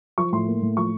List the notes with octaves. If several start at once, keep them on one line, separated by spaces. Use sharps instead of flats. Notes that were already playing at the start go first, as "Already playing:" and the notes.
F3 C#6
A2 C6
A#3
A2
F3 C#6